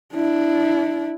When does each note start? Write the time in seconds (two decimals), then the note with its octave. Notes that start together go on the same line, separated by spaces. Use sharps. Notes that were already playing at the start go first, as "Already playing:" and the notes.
0.14 D4 E4